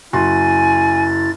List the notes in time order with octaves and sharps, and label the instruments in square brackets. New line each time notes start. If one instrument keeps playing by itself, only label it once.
[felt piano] F#1 F#4 C6 [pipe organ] E4 A6 [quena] G#5